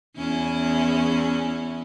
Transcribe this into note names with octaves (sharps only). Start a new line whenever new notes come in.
E2 C#4 E4